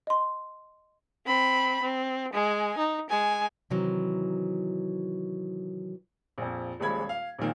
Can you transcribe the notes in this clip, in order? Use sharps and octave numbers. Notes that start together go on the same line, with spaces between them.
D#5 C6
C4 B5
C4
G#3 G#5
D#4
G#3 G#5
C3 D#3 E3 F#3
A#1 F2
D#1 A#1 G#3 B5 G#6
F5
A#1 A#2 D#3 A#3